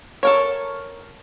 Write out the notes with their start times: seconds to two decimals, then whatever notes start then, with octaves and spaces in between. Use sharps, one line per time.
0.23 A4 A#4 C#5